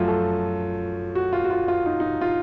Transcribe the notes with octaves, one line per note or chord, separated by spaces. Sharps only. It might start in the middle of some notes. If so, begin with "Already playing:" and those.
Already playing: F#2 F3 A3 F4 F#4
A4
F#4
F4
F#4
F4
F4
D#4
D#4
F4